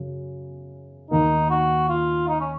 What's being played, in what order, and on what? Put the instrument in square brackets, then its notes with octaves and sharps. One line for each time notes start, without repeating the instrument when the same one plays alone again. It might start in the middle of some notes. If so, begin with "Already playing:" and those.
Already playing: [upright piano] F#2 C#3 F#3
[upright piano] D#2 D#3 A#3 [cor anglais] D#4
[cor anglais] F#4
F4
D#4
C#4